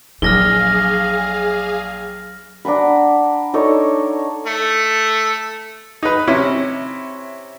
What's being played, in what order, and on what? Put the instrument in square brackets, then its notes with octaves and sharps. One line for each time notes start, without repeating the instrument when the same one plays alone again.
[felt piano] A#1 [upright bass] F#3 [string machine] G#4 F5 [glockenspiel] F6 A#6 G7
[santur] D4 F#5 A#5 B5
D4 D#4 A4 C#5
[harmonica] A3
[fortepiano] D#4 B4
C3 C#4 E4